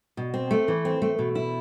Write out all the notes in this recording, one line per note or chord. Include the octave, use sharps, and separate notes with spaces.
B2
C4
A3
E3
C4
A3
B2
E4